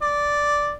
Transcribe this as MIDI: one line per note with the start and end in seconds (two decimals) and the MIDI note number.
0.02 0.75 74